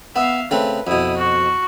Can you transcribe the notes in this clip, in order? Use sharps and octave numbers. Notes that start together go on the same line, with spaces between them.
B3 E5 F5
C#3 A3 C4 B4
F2 B2 E4 D#6
F#4